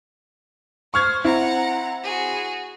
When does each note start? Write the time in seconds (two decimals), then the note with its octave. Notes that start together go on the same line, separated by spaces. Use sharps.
0.94 C5 C#6 F6 G#6
1.24 C4 E4 F#5 A#5
2.03 F#4 G#4